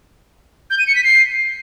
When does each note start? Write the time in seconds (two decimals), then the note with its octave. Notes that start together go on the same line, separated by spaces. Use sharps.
0.70 G6
0.79 D#7
0.87 C#7
0.96 B6
1.04 C7